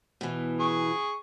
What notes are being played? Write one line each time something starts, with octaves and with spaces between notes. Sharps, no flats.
B2 E3
G#4 C#6